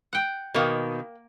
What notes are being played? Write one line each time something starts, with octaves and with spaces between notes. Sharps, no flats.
F#5 G5
B2 D#3 A#3 A#4 F5 G5